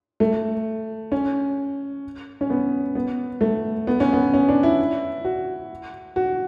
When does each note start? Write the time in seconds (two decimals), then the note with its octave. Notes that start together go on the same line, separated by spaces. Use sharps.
0.20 A3
1.12 C#4
2.41 C#4
2.50 B3
2.95 B3
3.41 A3
3.87 B3
4.00 C#4
4.13 B3
4.34 C#4
4.48 D4
4.63 E4
5.25 F#4
6.16 F#4